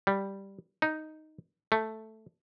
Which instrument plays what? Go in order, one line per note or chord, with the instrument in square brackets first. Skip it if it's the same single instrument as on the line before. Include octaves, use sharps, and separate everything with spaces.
[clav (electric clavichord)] G3
D#4
A3